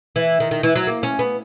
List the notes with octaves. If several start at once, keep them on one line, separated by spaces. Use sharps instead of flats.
E3
D#3
D#3
E3
F#3
A#3
C#4
B3